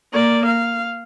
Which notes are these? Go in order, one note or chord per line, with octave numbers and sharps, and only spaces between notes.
A#3 D5
F5